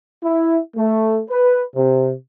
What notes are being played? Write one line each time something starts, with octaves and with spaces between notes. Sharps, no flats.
E4
A3
B4
C3